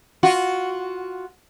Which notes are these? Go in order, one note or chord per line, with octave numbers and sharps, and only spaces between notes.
F4 F#4